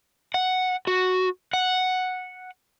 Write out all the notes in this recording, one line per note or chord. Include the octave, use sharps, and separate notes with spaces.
F#5
F#4
F#5